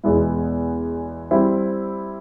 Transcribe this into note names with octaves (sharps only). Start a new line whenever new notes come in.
E2 B2 G#3 B3 E4
G3 C4 E4